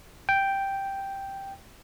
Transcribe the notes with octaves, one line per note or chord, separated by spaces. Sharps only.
G5